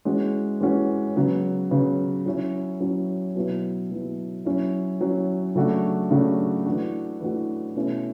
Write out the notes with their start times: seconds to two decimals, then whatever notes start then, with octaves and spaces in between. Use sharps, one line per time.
0.05 E3 G#3 C#4 F#4
0.60 E3 G#3 C#4 F#4
1.16 C#3 F#3 B3
1.71 C#3 F#3 B3
2.26 F#3 C#4 E4
2.80 F#3 C#4 E4
3.35 B2 F#3 B3 E4
3.91 B2 F#3 B3 E4
4.45 F#3 C#4 E4
5.01 F#3 C#4 E4
5.55 C#3 F#3 A3 D4 F#4
6.11 C#3 F#3 A3 D4 F#4
6.66 E3 A3 D4 F#4
7.21 E3 A3 D4 F#4
7.76 B2 A3 C#4 E4